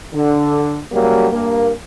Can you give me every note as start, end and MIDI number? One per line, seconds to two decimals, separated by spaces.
0.14 0.78 50
0.92 1.27 49
0.92 1.27 54
0.92 1.27 55
0.92 1.27 58
1.32 1.71 43
1.32 1.71 58